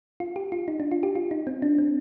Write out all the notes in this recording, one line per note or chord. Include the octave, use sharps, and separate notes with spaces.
F4
G4
F4
D#4
D4
F4
G4
F4
D#4
C4
D4
C4